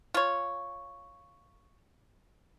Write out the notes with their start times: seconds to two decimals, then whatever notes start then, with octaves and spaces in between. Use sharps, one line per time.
0.14 F4 C#5